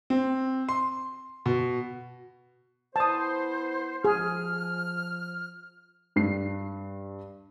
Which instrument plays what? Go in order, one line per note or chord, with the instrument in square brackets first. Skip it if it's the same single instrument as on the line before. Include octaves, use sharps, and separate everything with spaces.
[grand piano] C4
C6
B2
[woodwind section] B3 E4 C5 [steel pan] A5 D#6
[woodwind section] F3 F6 [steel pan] G#4
[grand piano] G2 C7